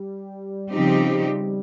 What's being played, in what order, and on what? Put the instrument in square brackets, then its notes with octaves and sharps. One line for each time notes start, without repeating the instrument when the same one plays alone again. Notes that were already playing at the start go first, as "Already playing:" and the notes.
Already playing: [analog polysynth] G3
[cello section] C#3 F3 C4 D#4 G4